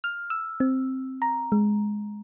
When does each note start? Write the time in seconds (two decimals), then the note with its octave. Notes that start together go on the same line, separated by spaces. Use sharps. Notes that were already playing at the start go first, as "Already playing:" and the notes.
0.04 F6
0.30 E6
0.60 C4
1.22 A#5
1.52 G#3